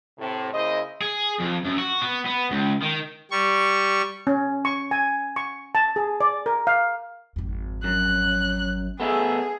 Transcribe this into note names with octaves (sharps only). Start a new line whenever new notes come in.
A2 C3
C#3 A#3 E4 C5 D#5
G#4
F2
F#2
F#4
B3
B3
C#2
D#3
G3 C#6
C#4
C#6
G#5
C#6
A5
G#4
D5
A#4
F5
G#1 F2
F#2 F#6
B3 G#4 A4 E5